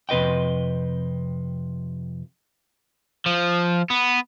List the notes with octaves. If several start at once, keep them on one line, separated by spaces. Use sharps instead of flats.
F2 C3 B4 D#5 G5
F3
B3